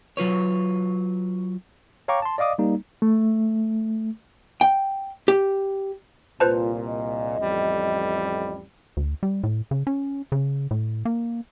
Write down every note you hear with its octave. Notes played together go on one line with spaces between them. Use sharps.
F#3 F4 B4 C#5
C#5 F5 G5 A#5 C#6 D6
A5 C6
D5 D#5 F5 D6 D#6
G3 A#3 D#4
A3
G5
G4
C2 A#2 F4 B4 C5 A5
D#5
A1 F2 G3
D2
G3
A2
C#3
C#4
C#3
A2
A#3